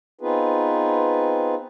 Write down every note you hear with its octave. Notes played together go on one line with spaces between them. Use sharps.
B3 C4 D#4 F4 G#4 B4